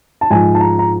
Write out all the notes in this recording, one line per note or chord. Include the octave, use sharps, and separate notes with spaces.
A5
G#2 F3 G#5
A5
A#5
A#5